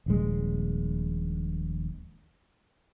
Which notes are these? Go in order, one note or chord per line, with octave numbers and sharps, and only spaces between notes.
D#1 A#1 G#3